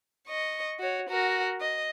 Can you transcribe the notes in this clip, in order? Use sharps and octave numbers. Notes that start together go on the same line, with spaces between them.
D#5 C#6
F#4 C#5
F#4 A#4
D#5